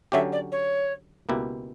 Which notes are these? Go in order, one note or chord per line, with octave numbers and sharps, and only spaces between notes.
D3 F#3 C#4 G4 E5
D5
C#5
C#2 B2 A#3 E4 G4